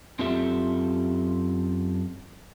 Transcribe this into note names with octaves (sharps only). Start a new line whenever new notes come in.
F#2 C4 F4 G4 A4 E5